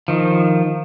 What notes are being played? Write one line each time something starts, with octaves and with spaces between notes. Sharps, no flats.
D#3 F3